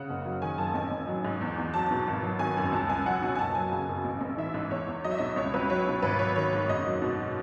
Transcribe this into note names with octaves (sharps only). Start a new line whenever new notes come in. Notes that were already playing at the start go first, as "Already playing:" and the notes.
Already playing: C#3 F#5
F#1
F#3
D#3 G#5
F#2 A5
A1 G#5
A1
F#3
G#2
E2
E2
F#3 A5
B2
G#1
F#3
D#3 G#5
F#2
C#2 A5
C#2 G#5
F#3 F#5
B2 G#5
G#5
F#1 A5
F#3 G#5
C#3
F#2
A1
A1
E3 E5
G#2
E2 C#5
E2
F#3 D#5
E5
B2 D#5
C#2 C#5
C#2 B4
F#3 C#5
B2
G#1 B4
F#3 C#5
D#3 C#5
G#2
F#1 D#5
F#3
B2